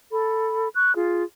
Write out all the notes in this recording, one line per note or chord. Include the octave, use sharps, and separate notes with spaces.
A4 B5
C#6 F#6
F4 G#4